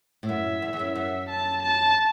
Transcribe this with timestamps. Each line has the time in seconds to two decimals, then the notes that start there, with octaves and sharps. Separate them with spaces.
0.23 A2
0.29 F#2 E5
0.62 E2
0.73 E2
0.79 F#2
0.95 F#2 E5
1.29 A5
1.63 A5